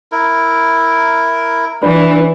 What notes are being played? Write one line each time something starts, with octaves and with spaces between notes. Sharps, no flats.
E4 A#4
E3 D4 B4